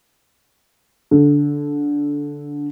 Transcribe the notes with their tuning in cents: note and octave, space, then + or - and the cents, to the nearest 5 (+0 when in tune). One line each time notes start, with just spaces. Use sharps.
D3 -15